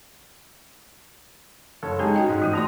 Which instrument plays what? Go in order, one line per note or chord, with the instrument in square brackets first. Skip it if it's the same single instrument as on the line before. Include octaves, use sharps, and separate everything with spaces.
[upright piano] F#1 A4 C#5
[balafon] G#3 G4 [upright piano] C#4 D#4 G#4
[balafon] F#4 D#5 G5
[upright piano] G#2
[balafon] E3 A3 F4
[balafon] A#3 D5 C6 [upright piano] D#6 F7